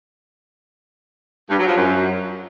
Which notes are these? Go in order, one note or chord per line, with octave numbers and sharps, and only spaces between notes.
G2
F#3
F3
F#2